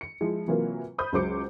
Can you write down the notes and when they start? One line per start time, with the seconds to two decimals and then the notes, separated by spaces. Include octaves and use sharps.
0.01 C#7
0.21 F3 G#3 E4
0.47 C3 E3 F#3 A#3 F4 A#4
0.98 C5 B5 D#6 G6
1.13 C#2 F#3 C5 D6 C#7